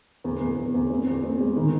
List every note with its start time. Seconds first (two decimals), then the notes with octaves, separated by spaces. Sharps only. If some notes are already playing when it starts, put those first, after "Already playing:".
0.24 E2
0.40 E2
0.57 E2
0.74 E2
0.90 C4
1.07 E2
1.23 C4
1.40 G#3
1.57 D#3